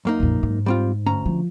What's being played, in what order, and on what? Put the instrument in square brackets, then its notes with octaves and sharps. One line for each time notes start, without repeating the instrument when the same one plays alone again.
[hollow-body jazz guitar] F#2 A#3 D#4
[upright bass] A#1 F2
G#2
[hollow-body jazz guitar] G3 C4 F4
D2 C#4 A#5
[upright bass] F3